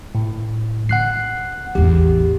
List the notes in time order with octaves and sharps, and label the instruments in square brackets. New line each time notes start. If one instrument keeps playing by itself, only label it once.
[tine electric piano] A2
[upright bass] D3 [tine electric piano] F#5 F#6 C7
[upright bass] A1 E2 [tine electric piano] G4